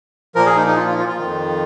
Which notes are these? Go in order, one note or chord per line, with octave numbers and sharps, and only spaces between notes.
A#2 F3 A#4
G#4
D#4
D#4
F4
F4
F4
F4
F2 D#3